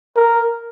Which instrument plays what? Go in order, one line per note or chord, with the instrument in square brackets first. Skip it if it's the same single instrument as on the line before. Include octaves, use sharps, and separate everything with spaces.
[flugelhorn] A#4